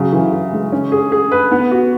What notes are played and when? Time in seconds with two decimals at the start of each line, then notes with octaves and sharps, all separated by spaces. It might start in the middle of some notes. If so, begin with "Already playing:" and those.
Already playing: C#3 F#3
0.13 E3
0.32 E3
0.52 G#3
0.72 C#4
0.92 G#4
1.12 G#4
1.32 B4
1.51 B3
1.72 F#4